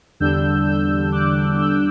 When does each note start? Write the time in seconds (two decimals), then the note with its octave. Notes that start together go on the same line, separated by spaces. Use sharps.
0.20 E2 D3 G3 D4 E6 G6
0.67 E6 G6
1.12 D6 F#6
1.59 E6 G6